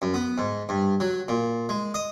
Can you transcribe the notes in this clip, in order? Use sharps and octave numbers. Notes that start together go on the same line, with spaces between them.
F#2
B3
G#2
G2
F#3
A#2
G#3
D#5